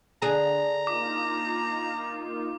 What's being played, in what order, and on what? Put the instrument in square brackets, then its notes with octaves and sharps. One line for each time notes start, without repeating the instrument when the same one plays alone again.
[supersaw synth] D3 [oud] D4 G#4 [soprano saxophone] A#5
[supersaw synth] A#3 D#4 F4 [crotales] D6